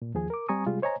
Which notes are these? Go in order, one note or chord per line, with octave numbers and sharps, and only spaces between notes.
A#2
D#2 F3 G#4 G#5
A#4 D6
G3 C4 G#5 A#5 C#6 D#6
C3 G3 G#3 F4 G#4
C5 C#5 D#5 G#5 A#5